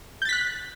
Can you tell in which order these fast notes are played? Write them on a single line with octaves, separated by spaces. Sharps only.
G6 A6 B6 F#6